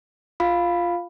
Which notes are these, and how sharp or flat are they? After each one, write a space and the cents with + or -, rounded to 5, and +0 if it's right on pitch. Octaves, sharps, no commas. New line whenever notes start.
F4 +0 F5 +0 B5 +0